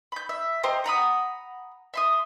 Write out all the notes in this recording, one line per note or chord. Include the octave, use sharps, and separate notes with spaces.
B5 G6
E5
G4 C5 D#5 A#5
F#5 A#5 B5 D#6
E5 C6 D#6